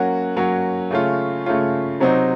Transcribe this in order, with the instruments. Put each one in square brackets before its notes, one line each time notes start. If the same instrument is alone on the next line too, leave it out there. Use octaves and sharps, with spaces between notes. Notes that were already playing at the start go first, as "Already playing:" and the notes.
Already playing: [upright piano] F#3 A#3 C#4 F#4
F#3 A#3 C#4 F#4
C#3 A3 C#4 F4
C#3 A3 C#4 F4
C3 F#3 C4 D#4